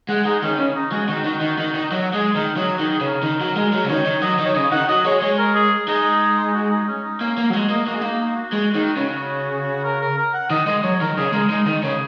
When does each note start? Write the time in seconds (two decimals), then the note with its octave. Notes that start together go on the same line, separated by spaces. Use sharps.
0.09 G#3 F#5
0.25 G#3 D#4
0.43 D#3 C#4
0.58 C#3 C#4
0.75 D#4
0.92 G#3 F#4
1.09 D#3 F#4
1.25 D#3 F#4
1.41 D#3
1.59 D#3
1.75 D#3
1.82 D#4
1.91 F#3 F#4
2.13 G#3 G#4
2.35 D#3 A#4
2.57 F#3 G#4
2.74 F#4
2.80 D#3
2.90 G#4
3.01 C#3
3.07 A#4
3.23 D#3
3.40 F#3
3.56 G#3
3.73 F#3
3.85 C#3
3.89 D#3 C#5
4.06 D#3
4.22 F#3 D#5
4.39 D#3
4.45 C#5
4.55 C#3 D#5
4.72 D#3 F#5
4.89 F#3 D#5
5.05 G#3 C#5
5.22 G#3 C#5
5.38 A#4
5.55 G#4
5.87 G#3 D#4
6.54 F#4
6.70 D#4
6.88 C#4
7.04 D#4
7.20 A#3 C#4
7.37 A#3
7.50 F#3
7.53 G#3 F#4
7.69 A#3 D#5
7.87 A#3 F#4
7.94 G#3
8.01 A#3 D#4
8.20 D#4
8.36 F#4
8.52 G#3
8.75 D#3
8.96 C#3
9.84 A#4
10.01 A#4
10.18 A#4
10.34 F#5
10.50 D#3 D#5
10.67 G#3 D#5
10.83 F#3 C#5
10.95 C#5
11.00 D#3 A#4
11.17 C#3 G#4
11.33 G#3 A#4
11.50 G#3 D#4
11.66 D#3
11.83 C#3 G#4